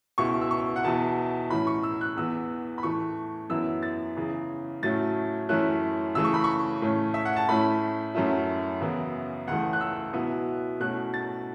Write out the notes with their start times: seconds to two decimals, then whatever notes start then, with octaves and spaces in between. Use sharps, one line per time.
0.18 C#2 B2 B3 E4 C#6
0.41 E6
0.51 C#6
0.76 F#5
0.84 E2 B2 B3 E4 A5
1.50 A2 E3 C#4 B5
1.67 C#6
1.83 E6
2.01 F#6
2.17 E2 E3 B3 E6
2.78 B5
2.83 A2 E3 A3 C#6
3.50 F#2 E3 B3 E4 E6
3.83 A6
4.16 E2 C#3 E3
4.83 A2 F#3 A3 C#4 E4 A6
5.49 F#2 E3 A3 C#4 E4 F#6
6.15 C#3 E3 A3 E6
6.25 C#6
6.34 B5
6.44 C#6
6.82 A2 A3 C#4
7.14 E5
7.25 F#5
7.36 A5
7.49 A2 A3 C#4 E4 B5
8.15 F#2 F#3 A3 C#4 E4
8.81 F#2 C#3 E3 B3 E4
9.48 C#2 C#3 E3 A3 F#5
9.73 F#6
9.81 E6
10.13 B2 F#3 B3 E4
10.80 B2 A3 C#4 E4 F#6
11.14 A6